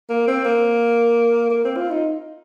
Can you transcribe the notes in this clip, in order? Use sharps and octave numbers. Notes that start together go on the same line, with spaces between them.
A#3
C4
A#3
A#3
C4
F4
D#4